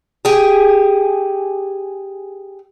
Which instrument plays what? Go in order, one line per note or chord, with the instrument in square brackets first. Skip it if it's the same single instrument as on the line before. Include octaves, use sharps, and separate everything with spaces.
[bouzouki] G4 G#4